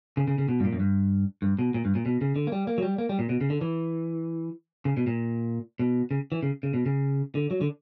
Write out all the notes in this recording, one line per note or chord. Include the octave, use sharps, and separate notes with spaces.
C#3
C#3
C#3
B2
G2
A#2
F#2
G2
G2
B2
A#2
G2
A#2
B2
C#3
D3
A#3
G3
A#3
F#3
G3
A#3
G3
A#2
B2
C#3
D3
E3
C#3
B2
A#2
B2
C#3
E3
C#3
C#3
B2
C#3
D3
F#3
D3